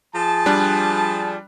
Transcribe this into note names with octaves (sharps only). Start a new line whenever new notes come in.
F3 G#4 A5
G3 D4 F#6